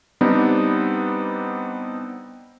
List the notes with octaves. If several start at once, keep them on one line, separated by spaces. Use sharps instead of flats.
G3 B3 C4 D4 D#4